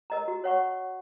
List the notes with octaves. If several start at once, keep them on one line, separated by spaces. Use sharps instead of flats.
A#4 D#5 A#5
F#4
C#5 F#5 C#6